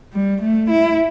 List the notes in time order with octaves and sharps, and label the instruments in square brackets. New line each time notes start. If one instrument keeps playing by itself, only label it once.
[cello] G3
A3
E4